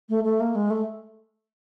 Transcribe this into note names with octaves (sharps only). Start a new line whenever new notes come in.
A3
A3
A#3
G#3
A3